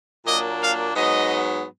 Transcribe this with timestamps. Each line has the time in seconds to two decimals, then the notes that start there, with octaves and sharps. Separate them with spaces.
0.25 A#2 F#3 A#3 D4 D#5
0.61 F5
0.95 G#2 F#3 B3 D#5